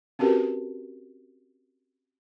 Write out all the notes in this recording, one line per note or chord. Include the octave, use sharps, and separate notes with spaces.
C4 C#4 F#4 G4 A#4 B4